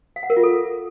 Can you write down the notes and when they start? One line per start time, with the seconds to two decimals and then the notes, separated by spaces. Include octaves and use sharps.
0.16 F5
0.23 F#5
0.30 A#4
0.37 F4
0.43 A4